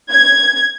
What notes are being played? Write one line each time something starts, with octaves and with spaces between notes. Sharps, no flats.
G#6